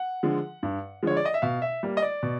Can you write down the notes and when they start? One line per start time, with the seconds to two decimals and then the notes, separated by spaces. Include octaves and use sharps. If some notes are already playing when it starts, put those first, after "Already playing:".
Already playing: F#5
0.23 D3 F3 G#3
0.63 G2
1.03 D3 F3 G#3 C#5
1.17 D5
1.25 D#5
1.34 E5
1.42 B2 F5
1.62 E5
1.83 G3 A#3
1.97 D#5
2.02 D5
2.23 B2